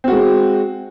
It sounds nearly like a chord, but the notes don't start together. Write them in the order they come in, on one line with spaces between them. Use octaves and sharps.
C4 F#4 G#3